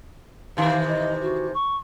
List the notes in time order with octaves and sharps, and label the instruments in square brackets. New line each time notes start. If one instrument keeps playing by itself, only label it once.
[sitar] C3 D#3 E3 [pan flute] F5
[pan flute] D#5
F#4
C#6